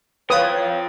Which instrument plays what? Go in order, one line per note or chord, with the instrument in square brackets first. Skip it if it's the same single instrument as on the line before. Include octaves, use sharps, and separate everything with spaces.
[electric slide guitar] F3 F4 G5 [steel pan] B4 D#6 [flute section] C#5 F5